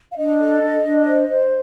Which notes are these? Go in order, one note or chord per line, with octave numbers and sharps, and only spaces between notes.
F5
D4 D#5
A4
D4
D4
C5
C5